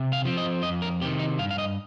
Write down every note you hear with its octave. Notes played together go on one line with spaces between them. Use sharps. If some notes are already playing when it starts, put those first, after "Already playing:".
Already playing: C3
F5
F3 C4
D#5
F2 D#5
A#4
C3 D#3 G4
D#4
G2 F5
F5
D#5